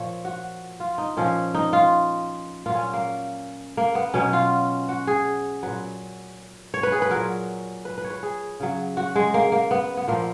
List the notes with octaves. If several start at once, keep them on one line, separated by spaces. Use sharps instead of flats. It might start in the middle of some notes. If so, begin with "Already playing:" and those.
Already playing: A#2 F3 C#5
F#4
F4
D#4
A#2 F3 C#4
D#4
F4
A#2 F#3 F4
C#4
A#3
A#3
B3
B2 F#3 C#4
F4
F#4
G#4
A#2 F#3 B4
C#5
B4
G#4
B4
A#2 F#3 A#4
B4
B4
C#5
B4
G#4
C#3 F#3
F#4
G#3
A#3
A#3
B3
B3
A#2 F3 A#3